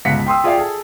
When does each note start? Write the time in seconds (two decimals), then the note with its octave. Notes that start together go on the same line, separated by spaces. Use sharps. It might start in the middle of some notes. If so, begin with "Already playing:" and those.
0.05 G1 C#2 F#5 B6 C#7
0.26 G5 C6 D#6 E6
0.44 F4 G#4 D5 E5 F5 G5
0.58 G#4 A4